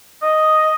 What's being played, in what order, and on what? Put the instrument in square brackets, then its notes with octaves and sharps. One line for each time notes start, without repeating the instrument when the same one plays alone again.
[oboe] D#5